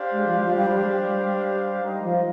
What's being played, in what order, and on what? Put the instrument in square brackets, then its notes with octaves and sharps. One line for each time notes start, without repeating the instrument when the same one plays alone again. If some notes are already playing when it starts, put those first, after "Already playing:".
Already playing: [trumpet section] D4 G4 C5 F5
[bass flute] G#3
F3
F3
G3
G3
G#3
G3
G3
G3
[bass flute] G3 [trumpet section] D#4 A#4 D#5
[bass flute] F3